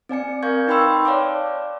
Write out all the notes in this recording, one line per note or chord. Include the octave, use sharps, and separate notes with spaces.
C4 D5 G#5 C#7
A#4 F5 C#6 G6 G#6
D#4 B4 G5 B5 C6 E6
G5
C#5 D5 F5 A5 D6